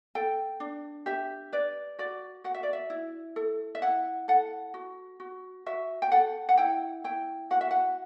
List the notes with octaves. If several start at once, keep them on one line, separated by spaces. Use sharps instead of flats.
A4 G5
D4
G4 E5
B4 D5
F#4 D5
F#4 F#5
E5
D5
E5
E4
A4
E5
E4 F#5
A4 F#5
F#4
F#4
F#4 E5
G5
A4 F#5
F#5
E4 G5
E4 G5
F#4 F#5
E5
F#5